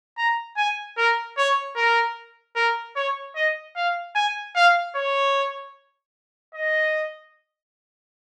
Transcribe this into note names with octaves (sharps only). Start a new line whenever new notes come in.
A#5
G#5
A#4
C#5
A#4
A#4
C#5
D#5
F5
G#5
F5
C#5
D#5